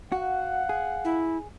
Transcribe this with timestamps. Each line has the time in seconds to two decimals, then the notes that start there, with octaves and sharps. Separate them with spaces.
0.12 F#4 F5 F#5
0.69 G#4
1.05 E4